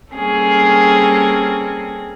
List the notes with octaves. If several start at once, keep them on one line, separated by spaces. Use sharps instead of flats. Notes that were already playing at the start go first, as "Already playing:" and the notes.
G3 A#3 C4 C#4 G#4 A4